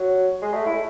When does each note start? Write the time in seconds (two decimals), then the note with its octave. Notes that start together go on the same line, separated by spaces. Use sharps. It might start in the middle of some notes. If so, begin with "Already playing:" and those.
Already playing: F#3
0.42 G#3
0.54 A3
0.66 E4